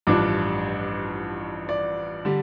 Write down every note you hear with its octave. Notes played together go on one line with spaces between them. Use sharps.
A1 G2 F3 D4 D6
D5
D3 G3